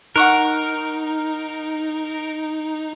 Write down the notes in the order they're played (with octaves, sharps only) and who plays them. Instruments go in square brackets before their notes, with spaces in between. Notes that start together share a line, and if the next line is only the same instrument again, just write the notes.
[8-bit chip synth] D#4 [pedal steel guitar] A#4 [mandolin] F#5 C#6 F#6